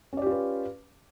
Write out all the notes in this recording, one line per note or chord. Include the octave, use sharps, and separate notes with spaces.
C#4 F4 G4 B4 D5